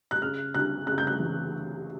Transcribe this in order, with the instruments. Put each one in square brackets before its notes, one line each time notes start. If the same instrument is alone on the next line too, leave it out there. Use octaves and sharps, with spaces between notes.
[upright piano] F#6
C#3 F6
D2 F#6
C#3 F#6
G6
F#6
E3